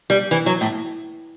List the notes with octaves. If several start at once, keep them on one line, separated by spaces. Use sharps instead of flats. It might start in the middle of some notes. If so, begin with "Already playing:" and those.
G3
E3
F#3
A2